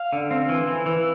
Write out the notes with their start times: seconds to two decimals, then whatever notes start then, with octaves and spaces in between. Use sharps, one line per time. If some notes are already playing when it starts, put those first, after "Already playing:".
Already playing: F5
0.13 D3
0.31 C4
0.49 E3
0.67 E3
0.86 E3